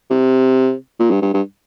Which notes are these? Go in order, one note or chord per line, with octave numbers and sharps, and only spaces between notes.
C3
A#2
G2
G2
G2